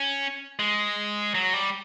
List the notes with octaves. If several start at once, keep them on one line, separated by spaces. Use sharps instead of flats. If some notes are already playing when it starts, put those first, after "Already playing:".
Already playing: C#4
G#3
F#3
G3